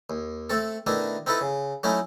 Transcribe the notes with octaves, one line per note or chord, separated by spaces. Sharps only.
D#2
A3 C4 A4
B2 D#3 A3 D4 E4
C4 D#4 E4 A4 B4
C#3
F#3 A3 C#4 D#4 E4